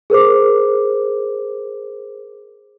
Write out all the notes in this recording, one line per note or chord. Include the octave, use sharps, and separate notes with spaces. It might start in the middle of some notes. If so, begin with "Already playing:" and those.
G#4 A#4 C5 D6